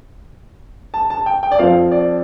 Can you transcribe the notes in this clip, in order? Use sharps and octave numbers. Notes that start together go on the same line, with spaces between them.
A5
A5
G5
G5
D5
F2 F3 C4 F5
D5